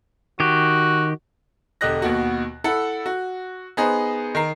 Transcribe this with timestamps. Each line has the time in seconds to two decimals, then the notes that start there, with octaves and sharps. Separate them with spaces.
0.40 D#3 F#4 G4
1.81 E1 D3 G4 D#5 F#6 A#6
2.02 D#2 B2 F#4
2.64 E4 A4 F#5
3.06 F#4
3.77 B3 D#4 G#4 C5
4.35 D#3 A#5 C7